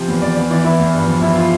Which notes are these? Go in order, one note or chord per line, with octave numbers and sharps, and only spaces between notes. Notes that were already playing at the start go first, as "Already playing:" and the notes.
Already playing: C3 F3
E2
E2 D5
E2 D5
E3 D5
E3 E4
E2
G2
F3
F3 E4
F4